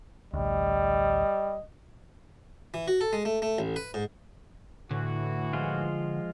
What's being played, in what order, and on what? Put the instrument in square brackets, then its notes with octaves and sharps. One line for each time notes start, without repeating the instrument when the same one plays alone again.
[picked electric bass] A1 D2 [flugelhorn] G3 [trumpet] D#5
[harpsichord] E3
F#4
A4
G#3
A3
A3
A1
B4
G#2
[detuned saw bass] A2 [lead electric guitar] D3 [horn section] E3 F#4
[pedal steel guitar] F3 G#3 F4